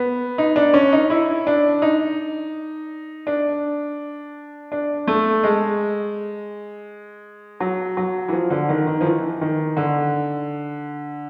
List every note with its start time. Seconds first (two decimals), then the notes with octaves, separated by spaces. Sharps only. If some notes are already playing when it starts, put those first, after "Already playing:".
Already playing: B3
0.38 D#4
0.56 D4
0.74 C#4
0.92 D#4
1.10 E4
1.47 D4
1.82 D#4
3.27 D4
4.72 D4
5.07 A3
5.43 G#3
7.60 F#3
7.97 F#3
8.28 E3
8.32 F3
8.50 D3
8.69 D#3
8.87 D#3
9.01 F3
9.05 E3
9.41 D#3
9.77 D3